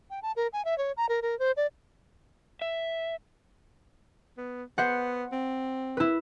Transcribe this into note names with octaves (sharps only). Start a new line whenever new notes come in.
G5
A5
A#4
G#5
E5
C#5
A#5
A#4
A#4
C5
D5
E5
B3
B3 C5 F#5
C4
E4 B4